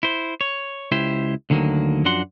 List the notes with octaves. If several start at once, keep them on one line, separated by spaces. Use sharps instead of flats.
E4 C5
C#5
C#2 E4 G4 C5
D2 D3 D#3 F#3 A#3
F#2 F3 D4 F#4 F#5 C6